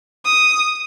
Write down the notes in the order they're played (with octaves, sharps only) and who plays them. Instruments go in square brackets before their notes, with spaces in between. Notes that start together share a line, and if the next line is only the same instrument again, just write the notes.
[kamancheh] D#6